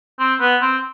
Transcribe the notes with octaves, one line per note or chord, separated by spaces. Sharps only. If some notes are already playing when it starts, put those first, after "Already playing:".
C4
B3
C4